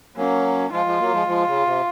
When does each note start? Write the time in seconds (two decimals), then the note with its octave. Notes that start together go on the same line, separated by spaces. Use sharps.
0.16 F#3 A#3 C#4
0.71 F3 G#3 F4
0.86 F3 G#3
1.00 F#3 A#3
1.14 F3 G#3
1.27 F3 G#3
1.46 C#3
1.65 C3